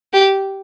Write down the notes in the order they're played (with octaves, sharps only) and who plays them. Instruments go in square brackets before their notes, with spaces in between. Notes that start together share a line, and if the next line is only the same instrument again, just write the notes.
[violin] G4